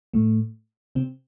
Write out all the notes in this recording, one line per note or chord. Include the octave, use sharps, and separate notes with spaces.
A2 A3
C3 C4